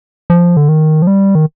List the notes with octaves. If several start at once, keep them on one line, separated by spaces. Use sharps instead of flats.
F3
D3
D#3
F3
G3
D#3